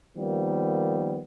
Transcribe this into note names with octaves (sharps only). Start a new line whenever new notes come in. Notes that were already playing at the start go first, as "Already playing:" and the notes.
D#3 F3 G3 A#3 B3